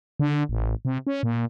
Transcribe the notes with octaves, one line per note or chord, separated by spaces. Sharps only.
D3
A1
C3
C#4
A#2